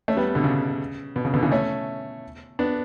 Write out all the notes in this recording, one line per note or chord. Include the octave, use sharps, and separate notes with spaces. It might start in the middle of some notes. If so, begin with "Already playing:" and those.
A3 C#4
G3 B3
B2 D3
C#3
B2
C#3
B2 D3
C#3 E3
A3 C#4
B3 D4